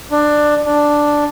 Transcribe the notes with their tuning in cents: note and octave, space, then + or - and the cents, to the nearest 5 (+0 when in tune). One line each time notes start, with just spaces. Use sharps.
D4 +15
D4 +0